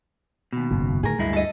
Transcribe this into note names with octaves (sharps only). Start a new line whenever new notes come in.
D#2 B2
F#1 G#2
A2 D3 D#3 G#4 A#4
D2 G2 G#3 E4
A4 D#5